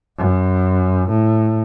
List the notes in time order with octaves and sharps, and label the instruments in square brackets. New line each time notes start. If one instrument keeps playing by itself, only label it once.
[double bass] F#2
A2